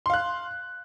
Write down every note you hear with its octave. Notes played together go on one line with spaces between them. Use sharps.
F5 C6 F#6